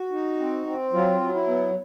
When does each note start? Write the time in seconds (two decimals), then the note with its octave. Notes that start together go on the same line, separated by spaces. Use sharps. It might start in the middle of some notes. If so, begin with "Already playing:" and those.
Already playing: F#4
0.12 D#4
0.39 C4
0.66 C4
0.93 F#3 F4
1.21 F#3
1.34 E4
1.47 B3